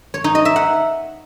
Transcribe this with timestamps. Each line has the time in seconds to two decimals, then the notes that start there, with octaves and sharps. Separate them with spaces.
0.14 C#5
0.24 D#4
0.35 D#5
0.45 E5
0.56 F#5